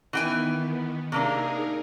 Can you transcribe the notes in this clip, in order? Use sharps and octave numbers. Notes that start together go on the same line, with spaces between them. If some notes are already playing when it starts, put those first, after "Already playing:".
D#3 E3 B3 G5 G#5
C3 A#3 D4 D#4 G#4 A#4